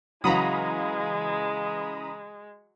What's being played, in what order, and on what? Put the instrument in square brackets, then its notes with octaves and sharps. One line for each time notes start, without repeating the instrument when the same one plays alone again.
[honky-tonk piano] C#3 E3 F5 [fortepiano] F#3 [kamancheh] G#3 [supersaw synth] A#5 B5 D#6